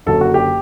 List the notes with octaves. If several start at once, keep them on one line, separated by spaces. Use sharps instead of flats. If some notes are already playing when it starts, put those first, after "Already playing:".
F#1 F#2 D3 F#3 A4
F#4
G4